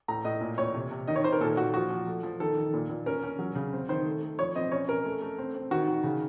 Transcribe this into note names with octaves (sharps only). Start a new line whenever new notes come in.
A2 A#5
A2 D#5
A#2
A#2 C#5
C3
C3
D#3 D#5
C#5
D#3 C5
A#4
A#2 A4
A#2 F#4
F3 F#4
F3
A3
F3
D#3 A4
D#3
A#2
A#2
C#4 A#4
C#4
F#3
C#3
C4
D#3 C5
A3
A3
F3 C#5
C4 D#5
C#4 C#5
C#4 A#4
A3
A3
C4
C4
D#3 F#4
D#3
C#3